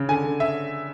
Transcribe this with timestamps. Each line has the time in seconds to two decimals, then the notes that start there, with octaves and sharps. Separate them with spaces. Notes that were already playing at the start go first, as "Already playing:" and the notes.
Already playing: C#3
0.09 D3 G#5
0.24 D3
0.40 E5